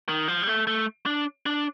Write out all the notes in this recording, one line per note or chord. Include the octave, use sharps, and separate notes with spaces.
D#3
F3
G3
A3
A3
D4
D4